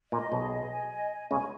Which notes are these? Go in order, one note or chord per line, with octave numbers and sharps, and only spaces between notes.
A#2 D#5
B1 B2 G#4
D#5
G#5
D#5
G#5
C#2 C#3 G#5